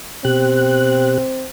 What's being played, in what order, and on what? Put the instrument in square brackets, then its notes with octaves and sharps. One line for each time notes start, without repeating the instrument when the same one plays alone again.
[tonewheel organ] B2 G4 F#6 [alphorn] C4